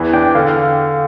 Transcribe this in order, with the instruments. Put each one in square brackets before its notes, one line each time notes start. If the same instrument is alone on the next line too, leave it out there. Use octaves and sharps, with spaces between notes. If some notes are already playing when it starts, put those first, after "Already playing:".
Already playing: [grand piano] E2 E3
[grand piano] D4 [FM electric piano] G5
[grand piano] D3 [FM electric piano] F5